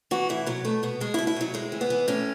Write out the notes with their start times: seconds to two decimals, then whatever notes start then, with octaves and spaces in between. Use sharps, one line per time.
0.11 E3 F#4
0.29 A2 E4
0.46 B2 F#3
0.65 B2 A3
0.83 B2 B3
1.00 B2 G#3
1.14 E4
1.19 B2
1.27 E4
1.36 B2 F#3
1.54 A2 G#3
1.72 E3
1.81 B3
1.90 E3
2.08 A2 C#4